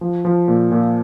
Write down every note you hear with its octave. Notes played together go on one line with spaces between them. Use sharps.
F3
F3
A#2
A#2